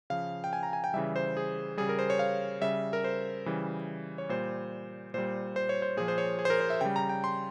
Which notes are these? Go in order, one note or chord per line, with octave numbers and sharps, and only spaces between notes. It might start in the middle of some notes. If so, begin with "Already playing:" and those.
C#3 F3 F5
G5
G#5
A#5
G#5
G5
C#3 E3 G3 E5
C5
G#4
C#3 G3 G#4
A#4
C5
C#5
F5
C#3 G3 E5
A#4
C5
C#3 E3 G3
C#5
A#2 G3 C5
A#2 G3 C5
C5
C#5
C5
A#2 F3 G#4
C5
C#5
G#4
C5
A#4
C5
E5
C#3 G3 G5
A#5
G5
C6